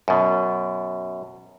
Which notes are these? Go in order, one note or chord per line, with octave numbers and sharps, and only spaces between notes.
F#2 B2